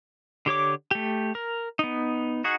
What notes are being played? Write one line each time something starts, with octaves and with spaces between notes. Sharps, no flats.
D3 G4 C#5 D6
A3 G4
A#4
B3 D#4
D#4 F#4 G#4 F#5